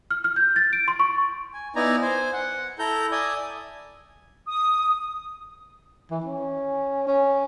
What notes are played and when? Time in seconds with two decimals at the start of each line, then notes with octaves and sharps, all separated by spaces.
0.11 F6
0.24 F6
0.36 G6
0.56 A6
0.73 D7
0.88 C6
1.00 C#6
1.53 G#5
1.76 B3 D#4 E4 D5 G#5 A#5
2.02 C5 G#5
2.34 F#5
2.79 E4 A4 A#5 G6
3.12 D5 E5 G#5 D#6
4.47 D#6
6.10 E3
6.24 C#4
7.07 C#4